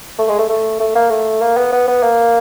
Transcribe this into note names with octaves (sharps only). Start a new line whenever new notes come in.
A3
G#3
A3
A3
A3
A#3
A3
A#3
B3
B3
B3
A#3